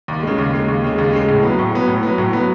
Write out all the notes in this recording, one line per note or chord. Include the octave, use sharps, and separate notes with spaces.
D#2
C#3 G#3
D#2
C#3 G#3
D#2
C#3 G#3
D#2
C#3 G#3
A2
F#3 B3
A2
F#3 B3
A2
F#3 B3
A2
F#3 B3